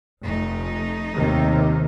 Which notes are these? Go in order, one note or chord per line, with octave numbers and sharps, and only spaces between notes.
F1 A3 D#4
D#2 C3 D#3